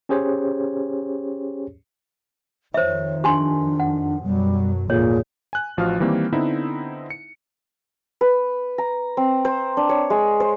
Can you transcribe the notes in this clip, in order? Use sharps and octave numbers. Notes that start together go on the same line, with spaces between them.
C#4 G4 G#4 C5 C#5
F2 D#3 F3 C5 C#5 E5
D4 G4 G#5 C6
F#5
F#2 B2 F#3 G3
G#1 F2 A#2 D3 G#4 C#5
G#5 F#6
A1 F3 F#4 F5 F6
D#3 E3 G3 A#3 C4
D3 B3 C4 D#4 E4 E5
C#7
B4
A#5
C4
C5
D4
C#5
G#3
C5